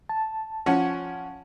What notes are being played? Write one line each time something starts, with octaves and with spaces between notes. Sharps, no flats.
A5
F3 C#4 F#5